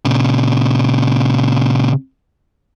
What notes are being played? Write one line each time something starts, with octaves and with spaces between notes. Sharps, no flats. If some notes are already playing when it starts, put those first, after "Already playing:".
A#2 C#3